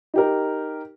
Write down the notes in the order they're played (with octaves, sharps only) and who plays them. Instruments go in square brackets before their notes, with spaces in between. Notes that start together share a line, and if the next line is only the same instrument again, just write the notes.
[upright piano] D#4 G4 A#4